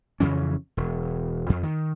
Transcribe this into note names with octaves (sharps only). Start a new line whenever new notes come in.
F2 C#3 E3 C#4
E1
F2
D#3